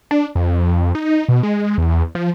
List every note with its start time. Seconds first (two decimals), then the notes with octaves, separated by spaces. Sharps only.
0.11 D4
0.35 F2
0.95 D#4
1.29 B2
1.43 G#3
1.78 E2
2.15 F3